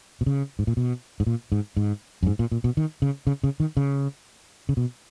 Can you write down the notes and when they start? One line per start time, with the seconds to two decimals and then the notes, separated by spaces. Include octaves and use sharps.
0.21 B2
0.26 C#3
0.59 G#2
0.67 A#2
0.77 B2
1.20 G#2
1.27 A#2
1.52 G#2
1.77 G#2
2.23 F#2
2.27 G#2
2.39 A#2
2.52 A#2
2.64 B2
2.77 D#3
3.02 C#3
3.27 C#3
3.44 C#3
3.60 D#3
3.77 C#3
4.69 C#3
4.77 B2